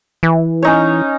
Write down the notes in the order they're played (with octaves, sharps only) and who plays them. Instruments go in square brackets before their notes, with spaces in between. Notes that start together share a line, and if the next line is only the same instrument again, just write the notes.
[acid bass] E3
[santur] C#4 D#4 C#5